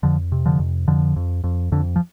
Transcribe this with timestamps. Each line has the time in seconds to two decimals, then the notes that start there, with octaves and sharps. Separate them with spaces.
0.03 F2 D3 F3
0.32 C3
0.46 D3 F3
0.59 F2
0.88 F2 D3 F3
1.16 F2
1.44 F2
1.72 F2 D3
1.96 F3